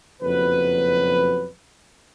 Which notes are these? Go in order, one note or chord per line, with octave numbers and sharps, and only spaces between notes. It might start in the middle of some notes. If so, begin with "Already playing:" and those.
F#1 F2 B2 F#3 B4